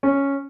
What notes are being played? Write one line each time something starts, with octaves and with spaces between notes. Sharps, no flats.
C#4